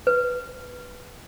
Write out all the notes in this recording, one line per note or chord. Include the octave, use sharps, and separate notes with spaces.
B4